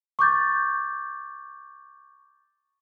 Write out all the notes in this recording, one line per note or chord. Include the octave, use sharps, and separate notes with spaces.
C#6 D6 G6 A6